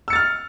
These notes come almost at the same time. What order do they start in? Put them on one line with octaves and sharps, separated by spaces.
E6 C#7 A6 F6